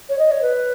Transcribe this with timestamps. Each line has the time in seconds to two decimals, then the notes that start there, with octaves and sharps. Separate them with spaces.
0.09 C#5
0.19 D#5
0.31 C#5
0.42 B4